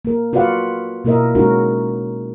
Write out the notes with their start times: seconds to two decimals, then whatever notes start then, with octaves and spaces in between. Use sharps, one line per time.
0.05 A#3 A#4
0.33 F4 F#4 B4 D5 F5 F#5
1.05 B2 A#3 E4 A#4 D#5 E5
1.35 G#3 C#4 D#4 F#4 A#4